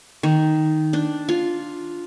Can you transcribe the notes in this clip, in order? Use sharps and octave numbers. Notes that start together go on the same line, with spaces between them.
D#3
D4
F4